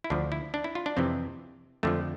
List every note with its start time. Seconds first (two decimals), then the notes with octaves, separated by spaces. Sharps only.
0.04 E4
0.10 D2 D3 F3 D4
0.32 E4
0.54 D4
0.64 E4
0.75 F4
0.86 D4
0.97 F2 C3 E3 C4
1.83 F2 D3 F3 A3